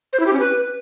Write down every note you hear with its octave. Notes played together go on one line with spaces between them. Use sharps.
C5
E4
G4
C#4
B4